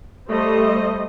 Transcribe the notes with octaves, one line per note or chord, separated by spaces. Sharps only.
G3 A3 C5 D#5